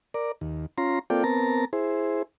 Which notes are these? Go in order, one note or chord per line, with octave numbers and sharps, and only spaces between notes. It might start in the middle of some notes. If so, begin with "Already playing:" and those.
A#4 D5
D#2
C#4 F4 A#5 C6
A#3 C4 F4 A4 D5 G5
B3 C4 A#4 A5 A#5
E4 G#4 C5